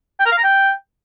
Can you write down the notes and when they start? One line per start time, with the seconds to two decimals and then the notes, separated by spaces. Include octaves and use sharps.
0.19 G5
0.25 A#4
0.32 F5
0.38 A#5
0.44 G5